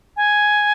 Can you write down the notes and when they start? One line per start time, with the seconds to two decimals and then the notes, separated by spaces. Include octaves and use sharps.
0.17 G#5